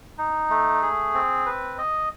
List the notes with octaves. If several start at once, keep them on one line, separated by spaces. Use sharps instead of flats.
D#4
A3
G#4
C4
B4
D#5